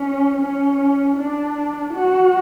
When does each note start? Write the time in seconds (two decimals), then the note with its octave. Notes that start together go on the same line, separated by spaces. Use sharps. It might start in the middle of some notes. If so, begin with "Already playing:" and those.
Already playing: C#4
0.41 C#4
1.17 D4
1.94 F#4